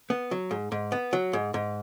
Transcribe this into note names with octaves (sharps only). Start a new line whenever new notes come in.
B3
F#3
G#2
G#2
B3
F#3
G#2
G#2